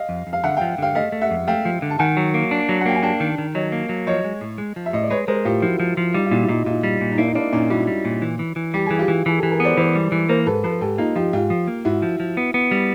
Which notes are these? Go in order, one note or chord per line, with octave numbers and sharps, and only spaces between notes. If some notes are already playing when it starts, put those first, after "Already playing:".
Already playing: D#5 F5
F2
F2
F5
D3 E5 F#5
F5 G5
F3
D3 F5 G5
A3 D#5 F5
A3
E5 F#5
F2
A3 F5 G5
F3
D3
A5
D#3 F#5 G#5
F#3
A#3
D4
F#3
F#5
A#3 G5
G#5
D4 G5 A5
D#3
D#3
F#3 C#5 D#5
A#3
F#3
F3 C#5 D#5
G#3
A2
G#3
F3
E5
A2 D#5
D5
G#3 B4 C#5
G#3 A#4 C5
A2 F4 G4
F3 E4 F#4
F3
F3
G3 D#4 F4
F4
A#2 E4 F#4
E4
A#2 D#4 F4
A#2 D#4 F4
G3
A#2
D#4
A#3 D4 E4
D#4
A#3 D4 E4
A#2 C#4 D#4
G3 E4 F#4
G3
A#2
E3
E3
E3
G3 G4
E3 G#4
F4 G4
E3
E3 G#4
G4 A4
E3
G#4 A#4
B3 C5 D5
E3 C5 D5
G3
E3
A#3 A#4 C5
G#2 A4 B4
F3 A4 B4
G#2 G4 A4
A#3 D#4 F4
F3 F4 G4
G#2 F4 G4
F3
A#3
G#2 E4 F#4
F3
F3
B3
B3
G3